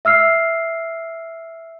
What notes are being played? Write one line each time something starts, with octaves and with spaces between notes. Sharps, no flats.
E5 E6 F6 C7